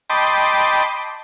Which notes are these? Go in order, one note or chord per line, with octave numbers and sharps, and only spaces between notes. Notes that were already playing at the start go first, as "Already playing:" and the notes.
D#5 G5 A5 B5 C6 D6